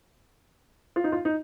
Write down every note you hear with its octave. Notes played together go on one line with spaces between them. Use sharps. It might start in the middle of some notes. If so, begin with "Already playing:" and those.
F4
D#4
F4
D#4